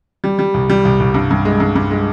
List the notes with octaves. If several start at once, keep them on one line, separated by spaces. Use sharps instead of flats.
G3
G3
C2
G3
C2
C2
G2
G2
G#3
G2
G2
G#3